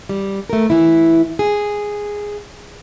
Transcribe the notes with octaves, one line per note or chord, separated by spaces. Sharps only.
G3
A3 A#4
E3 E4
G#4